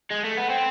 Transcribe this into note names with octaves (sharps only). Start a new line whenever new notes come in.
G#3
A3
B3
C4